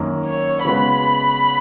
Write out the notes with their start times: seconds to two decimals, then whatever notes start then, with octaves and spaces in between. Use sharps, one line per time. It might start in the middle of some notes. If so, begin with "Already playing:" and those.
Already playing: F#2 D#3 A#3 C#4
0.26 C#5
0.65 C#3 G#3 B3 F#4 B4 B5